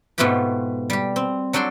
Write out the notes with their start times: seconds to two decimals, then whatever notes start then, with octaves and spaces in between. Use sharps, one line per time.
0.18 G#2 B2 A3 B3 F4 G4
0.90 G3 G4
1.16 C4
1.53 F#3 D4 A4 G5 C6